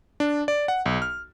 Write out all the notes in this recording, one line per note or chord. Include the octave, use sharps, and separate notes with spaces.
D4
D5
F#5
B1
F6